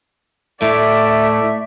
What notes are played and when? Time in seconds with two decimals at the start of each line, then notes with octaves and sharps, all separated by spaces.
0.62 A2 A3 D5 E5